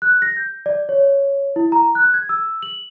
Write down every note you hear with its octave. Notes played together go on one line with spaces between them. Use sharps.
F#6
A#6
G6
D5
C#5
E4
A#5
F#6
G#6
E6
F#7